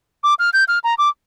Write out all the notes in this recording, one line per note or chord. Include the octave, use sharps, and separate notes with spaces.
D6
F6
G6
F6
A#5
D6